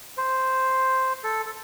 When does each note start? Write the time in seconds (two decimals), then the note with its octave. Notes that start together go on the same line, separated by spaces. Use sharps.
0.17 C5
1.24 A4
1.46 A4